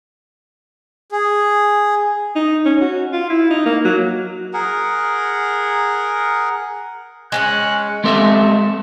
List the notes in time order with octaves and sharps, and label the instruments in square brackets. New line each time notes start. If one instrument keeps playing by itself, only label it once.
[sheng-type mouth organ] G#4
[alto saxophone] D#4
C#4
F#4
F4
E4
D#4
A#3
F#3
[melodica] G#4 A#4 F#5
[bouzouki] G#3 B3 C#4 [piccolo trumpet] F#6
[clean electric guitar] G#3 C4 G4 A4 D#5 E5